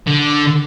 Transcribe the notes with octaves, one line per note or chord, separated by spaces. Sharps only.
D3